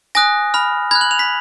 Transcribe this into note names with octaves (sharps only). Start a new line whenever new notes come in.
G#5 D#6 F#6 A#6
B5 F6
B5 F#6 G#6
F#7
F7
B6